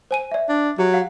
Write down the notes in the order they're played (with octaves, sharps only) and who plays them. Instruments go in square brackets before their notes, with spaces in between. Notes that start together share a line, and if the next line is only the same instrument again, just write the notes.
[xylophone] C5 G#5 D#7
D5 E5
[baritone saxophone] D4
[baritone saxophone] F#3 [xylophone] G4
[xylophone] F5 F#5